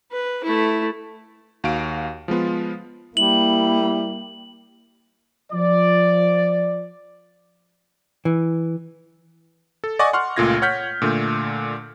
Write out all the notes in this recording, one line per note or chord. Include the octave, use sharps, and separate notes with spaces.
B4
A3 E4
D#2 F#4 F5 D7
F3 G#3 B3 F4
G3 A#3 E4 F#7
F3 D5
E3
A4
D5 D#5 F#5 G#5 C#6 D6
F#5 C6 C#6 F6
C#2 A#2 A3 F4 G#6 A#6
C#5 F#5 F6 G6 B6
A#2 D3 A3